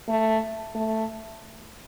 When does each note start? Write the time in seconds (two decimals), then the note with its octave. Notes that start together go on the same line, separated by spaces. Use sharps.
0.08 A3
0.75 A3